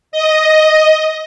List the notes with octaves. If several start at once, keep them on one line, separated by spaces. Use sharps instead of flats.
D#5